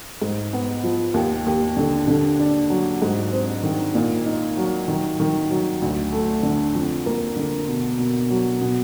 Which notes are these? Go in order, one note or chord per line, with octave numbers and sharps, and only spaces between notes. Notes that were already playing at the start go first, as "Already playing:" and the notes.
G#2
B3
F3
D#2
D#2
D3
D3
D4
F#3
G#2
C4
D#3
A#2
D#4
F#3
D#3
D#3
F#3
D2
A3
D3
F2
A#3
D3
B2
B2
F#3
B2